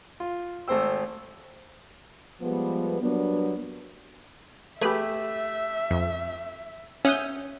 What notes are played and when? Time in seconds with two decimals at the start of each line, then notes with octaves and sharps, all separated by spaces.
0.20 F4
0.68 G#1 A3 C4 C5 G5 E6
2.41 F3 G3 G#3 B3
3.00 F#3 G3 A#3 B3 D4
4.81 A3 G4 G#4 B4 E5 B5
5.91 F2
7.05 C#4 E5 F#5 D#6 G6